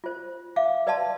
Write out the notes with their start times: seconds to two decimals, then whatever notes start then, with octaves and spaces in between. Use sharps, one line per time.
0.04 F4 C5
0.56 E5 F5 D6
0.87 B4 D5 D#5 F5 A5 C6